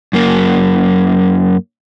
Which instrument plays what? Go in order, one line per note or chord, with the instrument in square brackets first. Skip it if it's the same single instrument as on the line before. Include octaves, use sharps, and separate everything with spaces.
[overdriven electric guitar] F#2 A#3